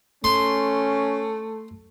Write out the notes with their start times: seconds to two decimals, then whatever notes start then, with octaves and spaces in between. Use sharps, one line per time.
0.24 A3 C#4 C6